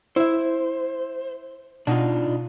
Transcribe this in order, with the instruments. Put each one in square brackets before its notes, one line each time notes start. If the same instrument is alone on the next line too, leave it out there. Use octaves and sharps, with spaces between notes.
[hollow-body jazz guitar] E4 E5 [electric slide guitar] C5
[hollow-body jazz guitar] B2 [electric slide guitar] D4 D#4 F4